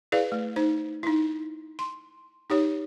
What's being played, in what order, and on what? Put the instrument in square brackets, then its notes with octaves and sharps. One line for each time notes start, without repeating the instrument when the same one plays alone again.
[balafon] E4 G#4 B4 D5 F5
A3
D#4 C5
D#4 E4
C6
D#4 G4 C#5